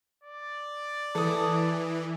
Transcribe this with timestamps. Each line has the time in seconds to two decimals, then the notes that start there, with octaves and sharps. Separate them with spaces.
0.23 D5
1.15 E3 A4 D#6